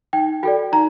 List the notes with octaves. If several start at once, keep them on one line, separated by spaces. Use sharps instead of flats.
D#4 G5
F#4 A4 D5 G5
D#4 A#5